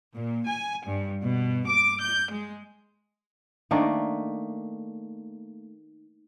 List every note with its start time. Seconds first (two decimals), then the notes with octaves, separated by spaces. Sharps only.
0.15 A#2
0.47 G#5
0.85 G2
1.24 B2
1.68 D6
2.01 G6
2.31 G#3
3.71 D#3 A3 A#3 D4